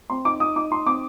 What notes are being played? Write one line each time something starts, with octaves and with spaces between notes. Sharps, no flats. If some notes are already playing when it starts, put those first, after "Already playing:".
C4 C6
D#4 D6
D#4 D#6
D#4 D6
D#4 C6
C4 D6